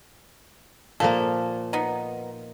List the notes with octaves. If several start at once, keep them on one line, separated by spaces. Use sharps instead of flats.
A#2 F3 A#3 A4
B3 D#4